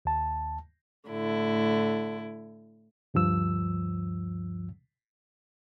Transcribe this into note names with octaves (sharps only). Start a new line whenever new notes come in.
D#2 A5
A2 D3 E4
D2 G2 F3 E6